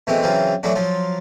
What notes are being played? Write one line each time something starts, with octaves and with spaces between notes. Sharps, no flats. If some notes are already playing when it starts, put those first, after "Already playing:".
B2 E3 G#3 A3 C4
C#3 E3 F#3 C4 F4
E3 F#3 A3 D4 F#4
F3 F#3 F4